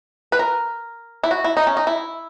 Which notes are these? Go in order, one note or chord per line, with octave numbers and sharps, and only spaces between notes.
B4
A#4
E4
F#4
E4
D#4
C#4
D#4
E4